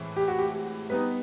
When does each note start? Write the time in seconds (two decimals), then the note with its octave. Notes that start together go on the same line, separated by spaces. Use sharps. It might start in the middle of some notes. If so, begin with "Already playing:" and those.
Already playing: A2 E3 G#3 C4 E4
0.16 G4
0.28 F#4
0.39 G4
0.89 G3 B3 D#4 B4